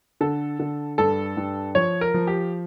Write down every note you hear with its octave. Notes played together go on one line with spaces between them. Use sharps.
D3 A4
D3
G2 A4
G2
F3 C#5
A#4
F3
G4